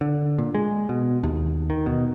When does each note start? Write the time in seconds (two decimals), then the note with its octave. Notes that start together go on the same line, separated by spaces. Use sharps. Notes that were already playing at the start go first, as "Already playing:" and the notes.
0.01 D3
0.38 A#2
0.55 G#3
0.89 B2
1.23 D#2
1.70 D#3
1.86 B2